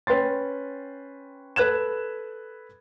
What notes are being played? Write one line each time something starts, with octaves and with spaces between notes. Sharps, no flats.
C#4 B4 G5 C6 A6
A4 B4 F#6 G#6 E7